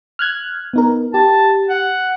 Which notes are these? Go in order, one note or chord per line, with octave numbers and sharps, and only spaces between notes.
F6 F#6 G#6
B3 D#4 A#4
G4 A5
F#5